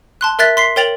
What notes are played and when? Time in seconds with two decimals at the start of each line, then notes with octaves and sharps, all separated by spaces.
0.21 A5 C6 F#6
0.39 A#4 E5 F#6 A6 B6
0.57 C6 B6 C7
0.76 A#4 C#5 G5 A6 F7 F#7